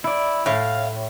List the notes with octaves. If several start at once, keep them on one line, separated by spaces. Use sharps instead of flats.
E4 D5
A2 F5